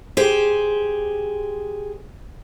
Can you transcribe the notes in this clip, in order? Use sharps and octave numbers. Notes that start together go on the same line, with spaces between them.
G4 G#4 C5